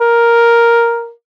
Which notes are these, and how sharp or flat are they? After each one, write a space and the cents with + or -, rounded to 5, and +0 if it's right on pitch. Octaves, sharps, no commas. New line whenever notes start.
A#4 +5